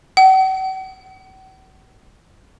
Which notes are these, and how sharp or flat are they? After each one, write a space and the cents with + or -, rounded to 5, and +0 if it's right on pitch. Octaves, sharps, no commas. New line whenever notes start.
F#5 +45